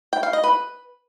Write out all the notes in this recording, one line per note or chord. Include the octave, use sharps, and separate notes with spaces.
G5
F5
D#5
B4